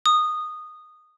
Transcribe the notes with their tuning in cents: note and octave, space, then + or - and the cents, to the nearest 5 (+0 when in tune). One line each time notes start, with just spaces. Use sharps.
D#6 -15